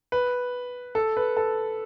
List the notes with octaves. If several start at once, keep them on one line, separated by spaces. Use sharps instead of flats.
B4
A4
B4
A4